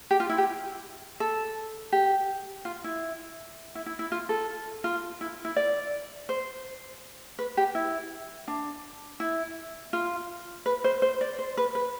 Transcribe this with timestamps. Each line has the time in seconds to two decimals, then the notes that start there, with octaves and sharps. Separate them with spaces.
0.11 G4
0.20 F4
0.29 E4
0.38 G4
1.20 A4
1.92 G4
2.65 F4
2.84 E4
3.75 E4
3.86 E4
3.99 E4
4.12 F4
4.29 A4
4.84 F4
5.21 E4
5.45 E4
5.56 D5
6.29 C5
7.39 B4
7.57 G4
7.75 E4
8.48 D4
9.20 E4
9.93 F4
10.66 B4
10.84 C5
11.02 C5
11.21 D5
11.39 C5
11.57 B4
11.75 B4